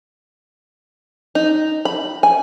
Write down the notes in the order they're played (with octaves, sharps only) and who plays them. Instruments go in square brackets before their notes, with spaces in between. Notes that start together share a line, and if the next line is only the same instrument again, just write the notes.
[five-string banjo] D#4
B5
G#5